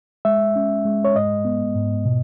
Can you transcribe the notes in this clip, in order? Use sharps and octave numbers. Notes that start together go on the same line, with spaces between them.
G#3 E5
C#4
G#3
C#5
G#2 D#5
B3
G#2
B2